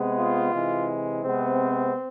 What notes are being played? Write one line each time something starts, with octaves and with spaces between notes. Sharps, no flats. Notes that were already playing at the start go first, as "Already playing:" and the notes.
Already playing: C3 G#3 B3
F4
C3 E3 G#3
C3 G#3 B3 C4